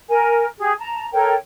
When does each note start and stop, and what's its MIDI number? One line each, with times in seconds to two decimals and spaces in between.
0.09 0.44 70
0.09 0.44 80
0.58 0.72 67
0.58 0.72 68
0.79 1.06 81
0.79 1.06 82
1.13 1.33 69
1.13 1.33 70
1.13 1.33 73
1.13 1.33 79